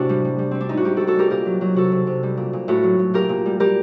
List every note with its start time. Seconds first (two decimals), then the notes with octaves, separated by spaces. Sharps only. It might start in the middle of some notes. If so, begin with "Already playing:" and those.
Already playing: A2 C3 D4 F#4
0.09 G3
0.24 G3
0.39 G3
0.51 G3 C4
0.61 D4
0.69 A2 D#4
0.77 F#4
0.85 G3 D#4 G4
0.96 G3 F#4 A4
1.07 F#4 A4
1.16 G3 G4 A#4
1.30 A#2 G4 A#4
1.46 F#3
1.61 F#3
1.75 C3 F#4 A4
1.92 C3
2.07 C3
2.23 G3
2.37 A#2
2.53 A#2
2.68 A2 F#4 A4
2.83 F#3
2.99 A2
3.14 A#2 G4 A#4
3.29 A#2
3.46 G3
3.60 G3 G4 A#4